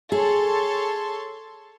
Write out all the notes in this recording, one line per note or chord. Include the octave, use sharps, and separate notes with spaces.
G#4 A4 C#5 C6